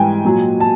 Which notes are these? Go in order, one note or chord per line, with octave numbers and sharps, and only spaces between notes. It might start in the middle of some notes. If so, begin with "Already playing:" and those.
Already playing: G#2 E3 G3 G5 G#5
A#2 F#3
A5